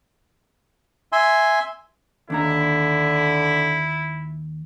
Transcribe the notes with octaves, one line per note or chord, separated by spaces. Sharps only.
E5 G#5 C6
D#2 D3 D4 E4 A#5